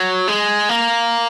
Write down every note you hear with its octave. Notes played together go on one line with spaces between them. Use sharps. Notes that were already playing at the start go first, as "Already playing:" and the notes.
Already playing: F#3
G#3
A#3